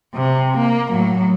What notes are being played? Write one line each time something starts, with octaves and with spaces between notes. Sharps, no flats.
C3
A#3
A2 F#3